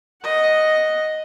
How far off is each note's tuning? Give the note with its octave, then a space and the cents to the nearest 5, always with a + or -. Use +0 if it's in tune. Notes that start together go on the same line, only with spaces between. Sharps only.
D#5 +0 F#5 +0